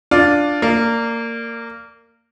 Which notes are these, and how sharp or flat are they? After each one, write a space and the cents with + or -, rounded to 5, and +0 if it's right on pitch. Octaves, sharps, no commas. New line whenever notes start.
D4 +0 F4 +5 D5 -5
A#3 -20 D5 +0